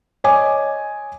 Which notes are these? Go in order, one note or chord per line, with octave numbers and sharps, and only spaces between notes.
C#5 D#5 G#5 D6